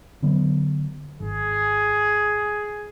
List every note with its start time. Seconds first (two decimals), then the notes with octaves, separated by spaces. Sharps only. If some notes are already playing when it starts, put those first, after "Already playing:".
0.22 D3 F#3 B3
1.20 G#1 G#4